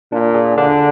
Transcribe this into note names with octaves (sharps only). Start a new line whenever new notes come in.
A#2 D4
G#4
D3 D4